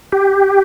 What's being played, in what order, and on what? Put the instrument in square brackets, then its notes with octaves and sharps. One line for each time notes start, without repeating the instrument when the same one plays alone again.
[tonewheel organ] G4